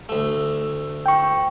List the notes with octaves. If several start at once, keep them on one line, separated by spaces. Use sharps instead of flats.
D2 A3
G5 C#6